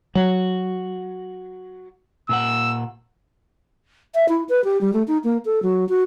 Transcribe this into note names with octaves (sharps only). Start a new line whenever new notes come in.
F#3 F#4
A#2 A#3 F#5 E6
E5
E4
B4
G4
G3
A3
D#4
A#3
A4
F#3
F#4